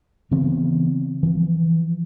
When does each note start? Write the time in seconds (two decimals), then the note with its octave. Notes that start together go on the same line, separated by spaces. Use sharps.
0.31 C#3 E3 B3 C4
1.23 E3 F3